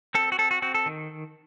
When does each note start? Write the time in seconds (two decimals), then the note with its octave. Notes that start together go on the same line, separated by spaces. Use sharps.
0.15 C4 A4
0.32 F#4
0.38 C4 A4
0.51 F#4
0.62 C4 F#4
0.74 A4
0.86 D#3